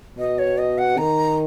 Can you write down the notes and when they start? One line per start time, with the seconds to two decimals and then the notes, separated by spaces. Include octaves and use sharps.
0.18 B2 D#5
0.39 C#5
0.58 D#5
0.78 F#5
0.97 D#3 A#5